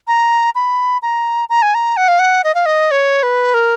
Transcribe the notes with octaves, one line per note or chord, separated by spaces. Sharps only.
A#5
B5
A#5
A#5
G#5
A#5
F#5
F5
F#5
D#5
F5
D#5
C#5
B4
A#4